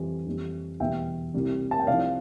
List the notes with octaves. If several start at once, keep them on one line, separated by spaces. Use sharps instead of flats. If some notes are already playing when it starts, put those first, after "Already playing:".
Already playing: F2 E3 G3
F2 E3 G3
E2 B2 G3 E5 G5
C2 C3 G3
A5
G5
C2 C3 F3 D5 F5